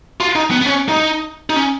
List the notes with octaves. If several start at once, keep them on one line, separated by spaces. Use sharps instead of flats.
F4
D#4
B3
B3
C#4
D#4
D#4
C#4